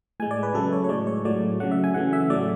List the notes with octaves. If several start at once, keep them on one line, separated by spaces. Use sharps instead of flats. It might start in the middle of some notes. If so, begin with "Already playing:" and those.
A2 G#3 G#5
D5
B4
C#3 F#3 A3 A4
C#5
C#5
A2 G#3 D5
C#5
A2 F#3 A3 D5
C#3 F#3 A3 F#5
E5
G#5
C#3 E3 A3 F#5
E5
A2 F#3 A3 D5